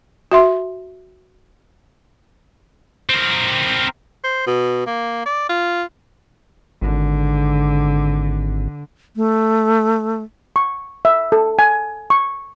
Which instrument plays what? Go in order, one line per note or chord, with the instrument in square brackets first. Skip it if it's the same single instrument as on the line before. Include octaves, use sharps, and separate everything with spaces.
[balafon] F#4 E5 C6
[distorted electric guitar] C4 A#4
[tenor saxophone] C5
B2
A#3
D5
F4
[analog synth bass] G#1 [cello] D3
[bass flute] A3
[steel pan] C#6
E5
A4
G#5
C#6